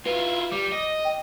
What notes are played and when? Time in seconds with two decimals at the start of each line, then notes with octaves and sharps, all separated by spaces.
0.06 E4 F4 B4
0.52 G3 D6
0.72 D#5
1.05 G5